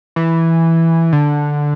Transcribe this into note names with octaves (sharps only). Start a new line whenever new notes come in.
E3
D3